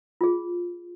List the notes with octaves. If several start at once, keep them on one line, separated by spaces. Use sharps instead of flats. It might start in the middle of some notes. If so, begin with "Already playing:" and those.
F4 G#4